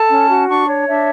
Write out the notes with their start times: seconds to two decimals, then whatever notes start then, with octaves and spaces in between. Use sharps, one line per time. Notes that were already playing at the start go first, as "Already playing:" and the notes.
Already playing: A4 A5
0.10 C#4
0.29 F#4
0.48 D4 C#6
0.68 C#5
0.87 D4 E5